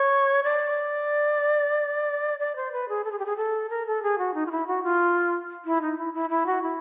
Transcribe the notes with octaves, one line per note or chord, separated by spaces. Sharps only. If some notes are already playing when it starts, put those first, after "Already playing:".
Already playing: C#5
D5
D5
C5
B4
G#4
A4
G#4
G4
G#4
A4
A#4
A4
G#4
F#4
D#4
F4
E4
F#4
F4
E4
D#4
E4
E4
E4
F#4
E4